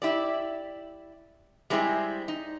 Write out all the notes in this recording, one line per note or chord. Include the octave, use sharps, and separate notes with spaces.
E4 G4 D5
G3 G#3 C4 E4 G#4
D#4